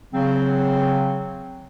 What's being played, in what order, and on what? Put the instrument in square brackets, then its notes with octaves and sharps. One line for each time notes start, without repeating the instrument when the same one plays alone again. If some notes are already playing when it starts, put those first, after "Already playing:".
[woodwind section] C#3 F#3 C4